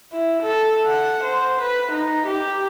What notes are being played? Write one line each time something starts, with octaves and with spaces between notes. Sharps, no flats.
E4
A4
F#5
C5
B4
D#4
G4